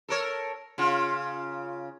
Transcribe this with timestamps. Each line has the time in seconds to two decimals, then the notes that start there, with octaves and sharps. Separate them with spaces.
0.08 A4 A#4 C#5
0.78 C#3 F4